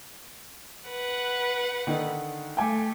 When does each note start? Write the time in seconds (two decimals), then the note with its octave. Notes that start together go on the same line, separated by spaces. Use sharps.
0.87 B4 F#5
1.87 D3 D#3 D#4
2.57 A3 G5 G#5 D6